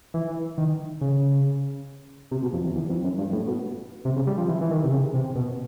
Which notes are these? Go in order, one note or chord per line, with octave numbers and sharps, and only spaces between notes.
E3
D#3
C#3
C3
B2
F2
E2
E2
F2
F#2
G2
A2
B2
C3
C#3
G3
F3
E3
E3
D#3
C3
C#3
C3
B2